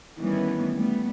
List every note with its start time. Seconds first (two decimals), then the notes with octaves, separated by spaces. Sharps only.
0.18 D#3 E3 G3 A3 B3 C#4
0.75 G3 A3 B3